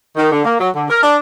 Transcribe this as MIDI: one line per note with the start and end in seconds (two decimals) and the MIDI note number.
0.16 0.27 51
0.30 0.41 50
0.45 0.55 58
0.59 0.69 54
0.74 0.85 50
0.89 1.00 70
1.02 1.16 62